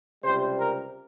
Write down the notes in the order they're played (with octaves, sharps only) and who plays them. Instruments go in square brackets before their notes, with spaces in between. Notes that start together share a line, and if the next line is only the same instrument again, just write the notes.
[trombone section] C#2 C3 G3 C5
A#4